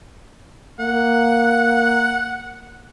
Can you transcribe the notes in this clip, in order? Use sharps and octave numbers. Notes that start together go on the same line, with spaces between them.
A#3 F#5